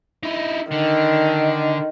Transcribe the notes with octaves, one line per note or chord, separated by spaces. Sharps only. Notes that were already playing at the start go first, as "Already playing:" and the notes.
D#4 E4
D3 D#3